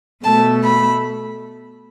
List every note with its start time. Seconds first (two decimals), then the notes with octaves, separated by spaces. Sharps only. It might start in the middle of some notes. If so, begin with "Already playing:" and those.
0.23 B2 A3 A5
0.63 B5